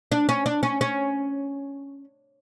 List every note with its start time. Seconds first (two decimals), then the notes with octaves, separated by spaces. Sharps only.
0.12 D4
0.29 C#4
0.46 D4
0.63 C#4
0.81 C#4